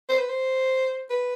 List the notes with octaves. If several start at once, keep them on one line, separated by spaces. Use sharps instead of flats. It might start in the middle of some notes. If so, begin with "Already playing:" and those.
C5
B4
C5
B4